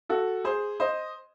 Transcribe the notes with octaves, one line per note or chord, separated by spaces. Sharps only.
F#4 A4
G#4 C5
C5 D#5